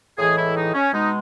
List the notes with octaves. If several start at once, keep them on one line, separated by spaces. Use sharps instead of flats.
A2 E3 G#3 G#4
E4
D#4
C#4
B2 G#3 D#4